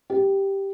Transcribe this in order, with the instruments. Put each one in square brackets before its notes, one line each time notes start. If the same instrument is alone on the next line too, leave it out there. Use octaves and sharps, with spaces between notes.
[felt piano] G4